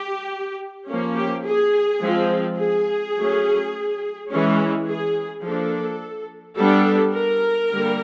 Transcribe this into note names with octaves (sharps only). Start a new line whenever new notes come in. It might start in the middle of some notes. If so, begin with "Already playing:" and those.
Already playing: G4
F3 A#3 C#4
G4
G#4
F3 G#3 C4
G#4
F#3 A3 C#4
E3 G#3 C#4
G#4
F3 A#3 D4 A4
G3 B3 D4 A4
A#4
D3 G3 A#3